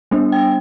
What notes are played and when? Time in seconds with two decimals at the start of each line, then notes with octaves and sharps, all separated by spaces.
0.11 G3 B3 D4
0.32 G5